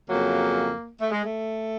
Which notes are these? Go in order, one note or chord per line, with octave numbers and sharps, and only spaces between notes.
F2 C#3 F#3 A#3
A3
G#3
A3